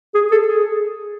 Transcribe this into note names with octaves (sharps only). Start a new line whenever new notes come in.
G#4
A4
G#4